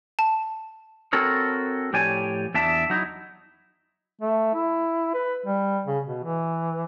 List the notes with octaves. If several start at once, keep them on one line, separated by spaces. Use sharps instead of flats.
A5
C4 F#4 A4 A#4 C#5
A2 F3 G4 C#5 D5 G#5
E2 D4 E5 A5
F#3 D#4 E4
A3
E4
B4
G3
C#3
B2
E3